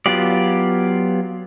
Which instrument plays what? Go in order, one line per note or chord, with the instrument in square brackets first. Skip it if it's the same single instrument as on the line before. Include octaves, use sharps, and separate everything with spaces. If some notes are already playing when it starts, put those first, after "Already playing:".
[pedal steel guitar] F#3 B3 F4 G4 D5